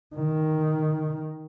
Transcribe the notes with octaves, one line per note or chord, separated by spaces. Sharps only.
D#3